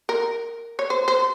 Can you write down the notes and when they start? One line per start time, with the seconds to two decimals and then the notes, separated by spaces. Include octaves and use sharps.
0.09 A#4
0.79 C#5
0.90 C5
1.08 C5